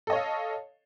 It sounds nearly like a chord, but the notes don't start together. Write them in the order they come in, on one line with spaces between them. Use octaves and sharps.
A4 D#5 C#5 F5